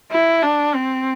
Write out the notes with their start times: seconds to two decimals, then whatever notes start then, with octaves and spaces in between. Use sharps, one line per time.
0.11 E4
0.43 D4
0.74 C4